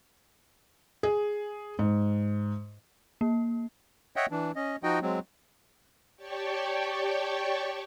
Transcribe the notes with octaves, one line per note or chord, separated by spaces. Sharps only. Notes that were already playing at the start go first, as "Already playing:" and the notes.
G#4
G#2
A#3
C#5 D#5 E5 F#5 G5
E3 D4
C#4 D#5
F3 D#4 F#4 D#5 G5
F#3 G#3 C4
G4 C#5 D5 G5 A5 C#6